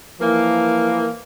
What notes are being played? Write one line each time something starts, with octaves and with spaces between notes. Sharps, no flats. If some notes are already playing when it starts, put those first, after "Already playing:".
E3 F3 A#3